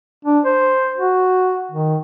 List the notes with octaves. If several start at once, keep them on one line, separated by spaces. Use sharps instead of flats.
D4
C5
F#4
D#3